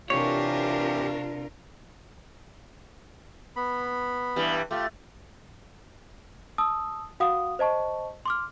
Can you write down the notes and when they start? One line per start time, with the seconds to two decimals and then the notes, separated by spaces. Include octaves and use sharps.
0.10 C3 E3 D4 F4 G4 A#4 C#5
3.56 B3 B5
4.36 G2 E3 G3
4.71 A3 F4 G4
6.58 A5 D#6 E6
7.20 F#4 F5 F#5 D#6
7.59 C5 D#5 A5 C#6
8.26 C6 D6 F6